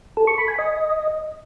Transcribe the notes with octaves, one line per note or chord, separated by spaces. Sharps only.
A4
C#6
B5
G#5
D#5